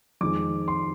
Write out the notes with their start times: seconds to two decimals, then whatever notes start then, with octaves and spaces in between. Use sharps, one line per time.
0.21 F2 D#3 G#3 D6
0.68 C6